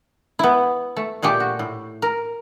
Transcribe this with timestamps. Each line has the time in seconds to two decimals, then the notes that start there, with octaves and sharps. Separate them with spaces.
0.39 B3 E4
0.97 A3
1.22 A#2 G#3 A3 G4
1.40 F#4
1.59 A2
2.02 A#4